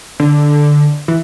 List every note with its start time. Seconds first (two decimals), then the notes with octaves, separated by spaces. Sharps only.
0.20 D3
1.08 E3